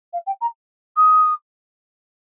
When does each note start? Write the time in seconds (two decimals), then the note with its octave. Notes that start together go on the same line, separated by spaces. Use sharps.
0.13 F5
0.26 G5
0.41 A#5
0.96 D#6